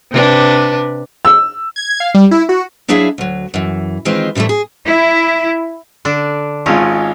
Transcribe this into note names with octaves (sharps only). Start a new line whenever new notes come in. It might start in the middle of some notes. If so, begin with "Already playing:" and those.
C3 D4 B4
E6
G#6
F5
G3
E4
F#4
F#3 D4 E4 G#4 E5 F5
D2 F#3
F#2 E3
D#3 E3 G#3 C4 F4
A2 C3 E3 G3 A3
G#4
E4
D3 D4
G#1 G#3 C#4 F4